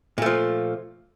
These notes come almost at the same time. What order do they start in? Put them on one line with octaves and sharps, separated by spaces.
A#2 A3 F3